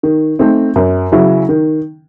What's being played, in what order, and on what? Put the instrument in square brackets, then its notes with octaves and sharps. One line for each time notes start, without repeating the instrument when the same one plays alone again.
[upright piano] D#3
A3 C4 D#4
F#2
C#3 F#3 C#4 E4
D#3